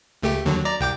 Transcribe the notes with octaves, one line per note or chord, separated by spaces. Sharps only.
C#2 A3 G4
D#2 D3 F#3
D5 A#5
C2 G5 D6